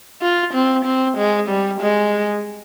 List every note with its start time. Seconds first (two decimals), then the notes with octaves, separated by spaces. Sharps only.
0.22 F4
0.54 C4
0.85 C4
1.17 G#3
1.49 G3
1.81 G#3